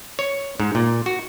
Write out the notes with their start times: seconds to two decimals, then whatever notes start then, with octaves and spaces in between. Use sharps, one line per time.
0.19 C#5
0.60 G#2
0.75 A#2
1.06 F#4